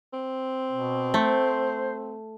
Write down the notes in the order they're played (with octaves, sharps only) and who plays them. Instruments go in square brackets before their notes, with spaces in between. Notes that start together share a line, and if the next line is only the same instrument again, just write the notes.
[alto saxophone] C4
[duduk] B2
[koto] A3 [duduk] C5